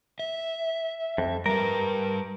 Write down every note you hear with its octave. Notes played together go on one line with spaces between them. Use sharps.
E5
F2
G3 A#4 B4